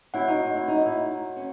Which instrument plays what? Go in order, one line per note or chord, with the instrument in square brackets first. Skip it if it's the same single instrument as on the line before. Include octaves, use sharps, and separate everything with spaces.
[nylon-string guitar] E4 [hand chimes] F#4 C#5 F#5
[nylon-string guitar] D#4
E4
D#4
E4
C#4